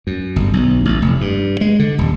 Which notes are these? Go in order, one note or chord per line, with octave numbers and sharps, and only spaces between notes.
F#2
G1
B1
A1
F1
G2
G#3
D3
D#1